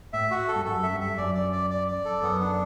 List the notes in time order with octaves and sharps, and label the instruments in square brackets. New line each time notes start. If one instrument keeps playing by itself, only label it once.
[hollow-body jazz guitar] A2 [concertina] E5
[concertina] F#4
A4
[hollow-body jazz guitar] G2
[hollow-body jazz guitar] F#2 [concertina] A4
[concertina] E5
[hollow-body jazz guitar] G2
[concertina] E5
[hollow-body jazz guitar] F#2 [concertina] D5
[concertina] D5
D5
D5
D5
A4
[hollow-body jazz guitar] F#2 [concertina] B3
[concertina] D4